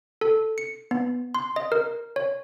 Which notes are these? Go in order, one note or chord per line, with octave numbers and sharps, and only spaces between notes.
A4
C#7
B3
C6
D#5
A#4
C#5